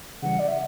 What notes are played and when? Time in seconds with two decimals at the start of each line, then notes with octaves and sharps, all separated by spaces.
0.23 C#3 E3 G3 F#5
0.39 D5
0.48 E5